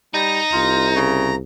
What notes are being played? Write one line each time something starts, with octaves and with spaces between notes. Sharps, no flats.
G3 D#4 A#5
C2 F4
C#3